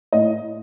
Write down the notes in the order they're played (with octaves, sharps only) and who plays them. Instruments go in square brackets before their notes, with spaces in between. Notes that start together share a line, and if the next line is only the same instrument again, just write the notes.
[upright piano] A2 D#5